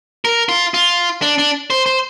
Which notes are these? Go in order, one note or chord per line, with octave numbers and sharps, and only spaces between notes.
A#4
F4
F4
D4
D4
C5
C5